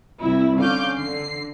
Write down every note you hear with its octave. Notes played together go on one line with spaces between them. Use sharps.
C2 E4
D3 C#4 F5 D6 G6
D3 C7